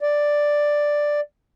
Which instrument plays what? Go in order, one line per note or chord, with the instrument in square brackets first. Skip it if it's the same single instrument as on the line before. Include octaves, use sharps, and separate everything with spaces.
[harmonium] D5